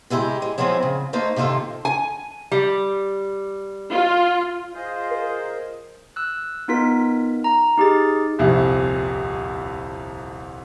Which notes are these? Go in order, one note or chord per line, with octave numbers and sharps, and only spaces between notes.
C3 G#3 E4 G4
G#3
F3 F#3 G#3 C4 E4
C#3
A3 A#3 D#4 C5
C3 D#3 A#3 F4 A4
G#5
G3
F4
F4 G#4 C5 D#5
A#4
E6 F#6
B3 D#4 F4 A#4 B6
A#5
D#4 G4 G#4 A6
D#1 C2 F2